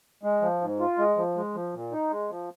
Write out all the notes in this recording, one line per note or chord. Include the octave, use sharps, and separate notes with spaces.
G#3
F3
G#2
F4
G#3
F3
G#3
F3
A#2
D#4
G#3
F3